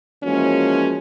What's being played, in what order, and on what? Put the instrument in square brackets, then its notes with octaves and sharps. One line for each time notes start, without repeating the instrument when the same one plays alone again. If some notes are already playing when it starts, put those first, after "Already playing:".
[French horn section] E3 F3 G#3 A#3 C#4 F#4